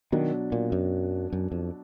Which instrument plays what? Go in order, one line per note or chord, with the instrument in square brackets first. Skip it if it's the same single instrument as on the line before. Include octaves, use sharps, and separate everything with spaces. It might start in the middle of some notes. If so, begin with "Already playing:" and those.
[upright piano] B2 F#3 D4 [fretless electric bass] D#3
[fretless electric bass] A#2
F#2
F#2
F2